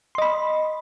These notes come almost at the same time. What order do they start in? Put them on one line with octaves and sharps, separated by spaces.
C6 D#5 B5